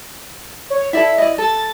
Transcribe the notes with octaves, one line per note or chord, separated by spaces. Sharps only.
C#5
E4 A4 D5 E5
D5 D#5
A4 A6